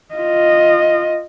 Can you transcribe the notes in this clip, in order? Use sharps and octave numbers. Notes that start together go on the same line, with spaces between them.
F4 D#5